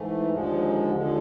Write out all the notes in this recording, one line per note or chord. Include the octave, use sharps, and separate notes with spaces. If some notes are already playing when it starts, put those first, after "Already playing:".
Already playing: G#2 E3 A3
D#2 D3 F3 G#3
D#2 D3 F3 G#3